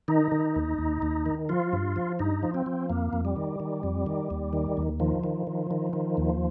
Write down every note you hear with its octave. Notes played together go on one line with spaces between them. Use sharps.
D#3 D#4
D#3
D#2
D#2
D#2
D#3
F3 F4
G2
F3
G2 D#4
F3
C4
F3
F2 A#3
F2
G3
D#3
D#3
F2
D#3
D#2
D#3
D#2
D#3 F3
D#3
D#3
D#3
D#3
D#2